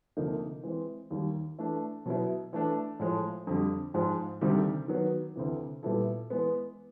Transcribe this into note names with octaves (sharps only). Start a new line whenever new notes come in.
D2 C3 F3 A#3 D#4
E3 G#3 C4
D#2 D#3 G3
E3 A3 D4
B2 F#3 B3 E4
E3 A3 D4
A2 F3 G#3
F2 D3 G3
G#2 F3 G#3
D2 C3 D#3 G3
D#3 F#3 B3
D2 C3 E3
A#2 G3 B3 E4 A4
E3 G#3 B3